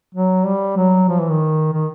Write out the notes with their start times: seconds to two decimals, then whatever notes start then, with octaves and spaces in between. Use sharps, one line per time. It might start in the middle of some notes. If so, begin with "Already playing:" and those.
0.14 F#3
0.45 G3
0.77 F#3
1.09 F3
1.19 E3
1.30 D#3
1.72 D#3